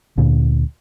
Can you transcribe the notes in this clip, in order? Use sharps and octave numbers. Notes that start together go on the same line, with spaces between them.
D2 A#2 D3